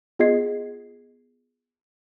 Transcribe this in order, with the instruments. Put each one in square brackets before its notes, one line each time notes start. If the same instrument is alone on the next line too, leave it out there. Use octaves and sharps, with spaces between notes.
[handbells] B3 F4 G#4 D#5 G#6 C7